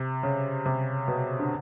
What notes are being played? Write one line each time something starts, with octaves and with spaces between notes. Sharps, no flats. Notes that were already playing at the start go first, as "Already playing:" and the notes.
Already playing: C3
C#3
C3
B2
D3